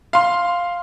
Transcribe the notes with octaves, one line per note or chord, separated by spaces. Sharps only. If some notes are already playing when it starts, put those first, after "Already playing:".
F5 C6